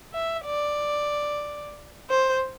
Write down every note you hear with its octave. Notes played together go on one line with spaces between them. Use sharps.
E5
D5
C5